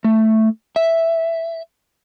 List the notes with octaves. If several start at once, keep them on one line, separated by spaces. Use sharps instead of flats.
A3
E5